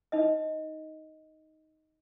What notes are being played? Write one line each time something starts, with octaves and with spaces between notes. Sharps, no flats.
D#4 D#5